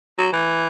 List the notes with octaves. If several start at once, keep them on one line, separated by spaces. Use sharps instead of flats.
F#3
E3